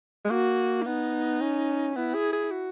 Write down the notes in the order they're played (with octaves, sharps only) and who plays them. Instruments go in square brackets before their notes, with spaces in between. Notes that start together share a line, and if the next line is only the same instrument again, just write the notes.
[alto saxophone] G#3
[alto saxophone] A#3 [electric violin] F#4
[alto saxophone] B3 [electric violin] D#4
[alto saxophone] C#4
[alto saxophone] B3 [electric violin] E4
[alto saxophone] G#4
G#4
F#4